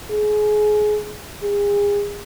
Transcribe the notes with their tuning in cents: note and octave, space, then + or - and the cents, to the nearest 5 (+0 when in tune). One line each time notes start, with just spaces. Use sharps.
G#4 +25
G#4 -35